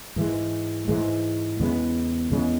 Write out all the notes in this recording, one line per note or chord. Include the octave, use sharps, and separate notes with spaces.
G#2 E3 G#3
G#2 E3 G#3
E2 C#3 G#3 B3
E2 C#3 G#3 B3